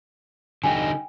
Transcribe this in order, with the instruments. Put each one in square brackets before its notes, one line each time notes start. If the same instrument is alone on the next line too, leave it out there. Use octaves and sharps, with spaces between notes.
[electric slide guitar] D3 G3 D#4 [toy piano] G5 G#5